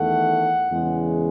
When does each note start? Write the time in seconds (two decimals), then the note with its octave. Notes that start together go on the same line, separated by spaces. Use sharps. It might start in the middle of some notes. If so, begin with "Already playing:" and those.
Already playing: E2 D#3 A3 F#5
0.70 E2 C#3 G#3